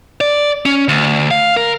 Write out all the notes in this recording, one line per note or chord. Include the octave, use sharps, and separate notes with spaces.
D5
C#4
D2
F5
A#4